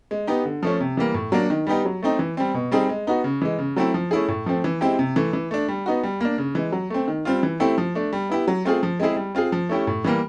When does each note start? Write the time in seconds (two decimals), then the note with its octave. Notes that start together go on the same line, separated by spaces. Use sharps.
0.11 G#3
0.27 B3 D#4 G4
0.45 D3
0.63 F3 A3 C#4
0.80 C3
0.97 E3 G3 A#3
1.14 A2
1.32 F#3 A#3 D4
1.50 D#3
1.67 G3 B3 D#4 G4
1.85 F#3
2.02 A3 C4 D#4
2.19 E3
2.37 G3 C4
2.54 B2
2.72 G3 C4 D#4 G#4
2.89 G#3
3.07 B3 D#4 F#4
3.24 C#3
3.42 E3 G#3
3.58 C#3
3.76 F#3 A3 C4 E4
3.94 F3
4.11 A3 C#4 E4 G#4
4.28 A2
4.46 F3 A3 C4
4.64 E3
4.81 G#3 C4 E4 G4
4.99 C3
5.16 E3 A3
5.33 E3
5.51 A3 D4
5.69 G3
5.86 B3 D#4 F#4
6.03 G3
6.20 A#3 D4
6.38 C#3
6.55 E3 G#3
6.72 F#3
6.90 A3 C4
7.08 D#3
7.25 G3 C4 F4
7.43 E3
7.60 A3 C4 E4 G4
7.78 F3
7.95 A3 D4
8.13 G3
8.30 B3 E4 G4
8.48 F#3
8.65 A3 C4 F4 G#4
8.83 F3
9.00 G#3 C4 E4 G#4
9.17 G3
9.35 C4 F4 G#4
9.52 F3
9.69 A3 C#4 E4 G4
9.87 A2
10.04 E3 G3 A#3